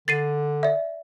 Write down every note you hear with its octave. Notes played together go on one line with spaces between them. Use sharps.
D3 A6 C7 D#7
D5 E5